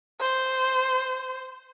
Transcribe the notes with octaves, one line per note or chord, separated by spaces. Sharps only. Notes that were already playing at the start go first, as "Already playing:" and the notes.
C5